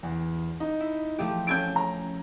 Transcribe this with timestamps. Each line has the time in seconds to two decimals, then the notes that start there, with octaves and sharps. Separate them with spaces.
0.03 E2
0.60 D#4
0.80 E4
1.19 F3 A3 G4
1.47 C#4 A4 G6 G#6 D7
1.76 A#5